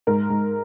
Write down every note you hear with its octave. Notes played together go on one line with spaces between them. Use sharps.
G#2 A#4
G#2